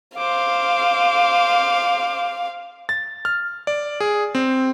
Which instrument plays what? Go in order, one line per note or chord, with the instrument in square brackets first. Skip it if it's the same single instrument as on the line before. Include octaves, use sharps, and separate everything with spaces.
[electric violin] C5 D6 [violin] F5
[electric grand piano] A6
F6
D5
G#4
C4